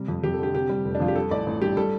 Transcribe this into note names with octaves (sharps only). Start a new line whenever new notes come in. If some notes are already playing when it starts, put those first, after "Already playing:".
Already playing: C3 G3
F2
F2 G4
A4
D3 G4
C3 G4
G3
F1
D4
F2 F4
G4
G3 A4
A1 D5
A1
G2 G4
G3 A4